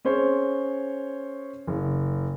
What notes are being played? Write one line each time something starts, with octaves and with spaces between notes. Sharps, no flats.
C#4 G#4 C5 C#5
F#1